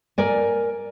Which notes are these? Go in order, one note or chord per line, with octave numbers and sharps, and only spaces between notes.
A#4 D5 G#5